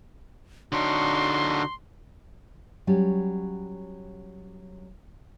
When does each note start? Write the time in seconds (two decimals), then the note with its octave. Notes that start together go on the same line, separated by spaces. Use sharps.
0.72 D3 D4 D#4 F#4 C#5 C6
2.87 F#3 G3 C#4